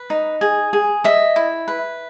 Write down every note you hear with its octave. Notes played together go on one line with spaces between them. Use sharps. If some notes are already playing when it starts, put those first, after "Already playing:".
Already playing: B4
D#4
G#4
G#4
D#5 E5
E4
B4